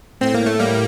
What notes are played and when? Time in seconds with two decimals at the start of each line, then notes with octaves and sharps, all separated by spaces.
0.20 A2 C4
0.34 A#3
0.46 A3
0.59 G3 A#3